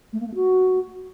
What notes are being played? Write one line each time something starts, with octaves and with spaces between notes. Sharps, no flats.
A3
A#3
A3
F#4